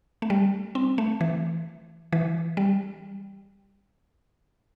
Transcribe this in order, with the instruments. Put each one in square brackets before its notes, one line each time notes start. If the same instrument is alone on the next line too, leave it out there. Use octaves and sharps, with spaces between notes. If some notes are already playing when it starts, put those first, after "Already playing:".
[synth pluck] A3
G3
C4
A3
E3
E3
G3